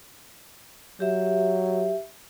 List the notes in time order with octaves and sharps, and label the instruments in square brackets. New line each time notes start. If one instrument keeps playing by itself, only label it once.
[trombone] F#3 [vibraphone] G4 E5